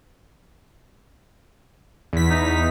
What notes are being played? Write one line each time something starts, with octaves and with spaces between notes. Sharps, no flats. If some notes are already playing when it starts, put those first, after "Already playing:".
E2 B6
D#4